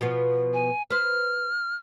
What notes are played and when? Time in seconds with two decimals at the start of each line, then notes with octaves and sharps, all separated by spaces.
0.01 B2 F3 B3
0.54 G#5
0.90 B4 C5 F6